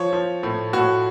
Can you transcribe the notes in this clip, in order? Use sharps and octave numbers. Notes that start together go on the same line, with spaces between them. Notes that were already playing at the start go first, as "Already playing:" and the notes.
Already playing: F3 C#5
F3
A2
A2 F#4